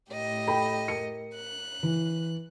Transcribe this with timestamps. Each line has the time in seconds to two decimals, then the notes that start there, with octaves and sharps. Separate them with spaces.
0.11 A2 G4 D#5
0.48 A4 G5 B5
0.88 A#4 C#7
1.33 F#6
1.83 E3